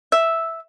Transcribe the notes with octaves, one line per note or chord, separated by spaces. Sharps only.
E5